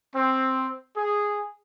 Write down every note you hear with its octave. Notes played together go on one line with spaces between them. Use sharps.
C4
G#4